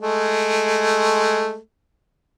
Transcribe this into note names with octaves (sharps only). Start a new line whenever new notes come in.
G#3 A3